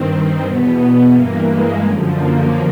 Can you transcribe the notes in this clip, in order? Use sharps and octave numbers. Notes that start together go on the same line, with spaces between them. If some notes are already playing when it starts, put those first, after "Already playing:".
Already playing: G2 D#3 C4
E2 B2 B3
G2 E3 A#3
G#3
F#2 D3 F3
A#3